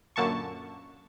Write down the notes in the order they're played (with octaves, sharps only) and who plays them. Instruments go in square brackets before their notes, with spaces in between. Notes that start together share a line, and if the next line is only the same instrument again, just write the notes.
[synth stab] F#2 A#2 D3 A5 C#6